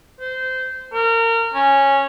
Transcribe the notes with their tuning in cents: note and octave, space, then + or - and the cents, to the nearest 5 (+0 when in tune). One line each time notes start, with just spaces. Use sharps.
C5 -20
A#4 -30
C#4 -10